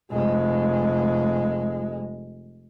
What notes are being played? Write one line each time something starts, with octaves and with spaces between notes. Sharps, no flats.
F1 G#3